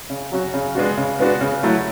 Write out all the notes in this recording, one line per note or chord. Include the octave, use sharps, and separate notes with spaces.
C#3
F#3 C#4 F#4
C#3
G#3 B3 D4 F#4
C#3
G#3 B3 D4 F#4
C#3
F#3 A3 E4